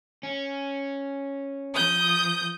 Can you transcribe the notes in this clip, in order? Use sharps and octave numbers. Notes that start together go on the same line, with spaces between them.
C#4
F3 D#6 G6